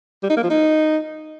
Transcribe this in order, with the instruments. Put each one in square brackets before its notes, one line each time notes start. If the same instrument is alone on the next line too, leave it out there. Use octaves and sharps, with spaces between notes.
[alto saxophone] G3
D#4
A#3
F3
D#4